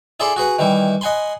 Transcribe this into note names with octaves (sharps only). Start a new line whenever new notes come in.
E4 G#4 A4 D5 B5 C6
F#4 G#4 B4 F#5
D#3 E3 G3 E4
D#5 F#5 G#5 B5 C6